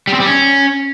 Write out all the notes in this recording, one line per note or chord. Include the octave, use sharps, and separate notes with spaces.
G3
C4
G3
C#4